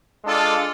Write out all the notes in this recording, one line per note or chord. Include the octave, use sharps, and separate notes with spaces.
G#3 D4 F4 A4 D5